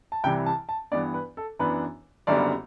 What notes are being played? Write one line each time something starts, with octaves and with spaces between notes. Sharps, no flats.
A5
C2 C3 E3 G3 G5
A5
A5
G2 E3 B3 D4 D5
B4
A4
F#2 E3 B3 D4 B4
F#1 F#2 D3 G3 B3 D5